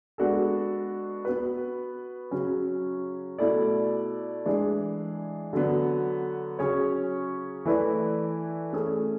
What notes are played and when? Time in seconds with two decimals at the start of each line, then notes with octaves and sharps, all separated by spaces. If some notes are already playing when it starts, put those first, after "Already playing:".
0.18 G#3 B3 D4 F#4 A4
1.25 B3 F#4 B4
2.31 C#3 F#3 C#4
3.38 B2 A3 E4 A4 D5
4.46 E3 G#3 D4 G#4
5.53 D3 F#3 B3
6.59 C#3 F#3 C#4 G#4 C#5
7.65 E3 A3 E4 B4 D5
8.73 A3 C#4 G#4